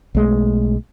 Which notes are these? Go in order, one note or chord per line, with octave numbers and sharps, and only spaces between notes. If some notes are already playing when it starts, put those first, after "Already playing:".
B1 G#3 A3